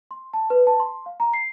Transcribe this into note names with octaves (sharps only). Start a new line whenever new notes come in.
C6
A5
B4
A5
C6
F5
A#5
C7